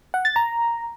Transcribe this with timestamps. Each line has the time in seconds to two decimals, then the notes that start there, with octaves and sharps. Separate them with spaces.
0.14 F#5
0.25 A6
0.36 A#5